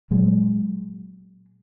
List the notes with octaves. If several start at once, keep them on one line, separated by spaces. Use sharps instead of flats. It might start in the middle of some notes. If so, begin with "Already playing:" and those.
A#2 F#3 G#3